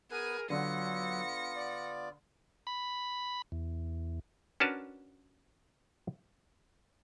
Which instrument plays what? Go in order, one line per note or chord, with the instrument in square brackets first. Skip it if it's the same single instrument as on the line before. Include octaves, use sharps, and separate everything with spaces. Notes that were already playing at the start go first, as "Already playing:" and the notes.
[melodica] B3 B4 [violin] G#4 G#5 [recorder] A#4
[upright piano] D3 [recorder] F#3 [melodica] B3 F4 [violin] A#6 C#7
[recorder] D5
[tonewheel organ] B5
E2
[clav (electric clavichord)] C#4 D4 F#4 A#4 B4 A5